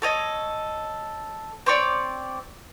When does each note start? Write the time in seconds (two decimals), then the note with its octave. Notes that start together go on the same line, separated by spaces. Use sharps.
0.02 A4 C#5 D#5
1.66 C4 C#5 D5